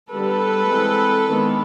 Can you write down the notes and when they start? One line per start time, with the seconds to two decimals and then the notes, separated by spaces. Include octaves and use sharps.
0.11 D3 G3 B3 A4 B4
0.68 E3 G#3 C4
1.27 D#3 G#3 B3 D4